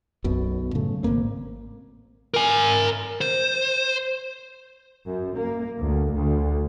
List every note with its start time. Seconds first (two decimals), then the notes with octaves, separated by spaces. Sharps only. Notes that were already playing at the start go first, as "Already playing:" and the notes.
0.24 B1 F#2 B2
0.75 A2 C#3 A3
1.03 G#1 G#2 A#3 C4
2.34 A#4 G#5
3.21 C5
5.06 F#2
5.36 A#3
5.79 D2
6.14 D2